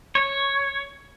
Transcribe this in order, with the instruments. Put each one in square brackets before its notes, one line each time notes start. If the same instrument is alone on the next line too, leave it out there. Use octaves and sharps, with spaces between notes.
[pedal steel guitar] C#5